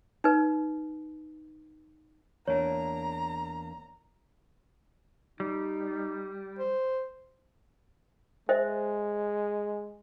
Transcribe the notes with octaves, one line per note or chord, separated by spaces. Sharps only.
D#4 B4
E2 A#3 D4 C#5 A#5
G3 D#4
C5
G#3 C5 D#5 E5